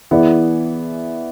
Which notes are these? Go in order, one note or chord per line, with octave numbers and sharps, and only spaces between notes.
E3 B3 E4 G#4 D5